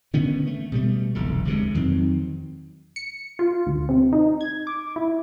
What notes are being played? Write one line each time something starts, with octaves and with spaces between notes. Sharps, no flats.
D3 D#3 B3 C#4
A3
B2 G3 A3
F1 B1 E2 D3
D2 C3 G#3
F2 D#3 F#3 C4
C#7
F4
D2
C3
D#4
G#6
D6
E4